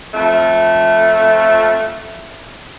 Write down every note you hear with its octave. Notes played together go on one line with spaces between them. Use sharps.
F2 A3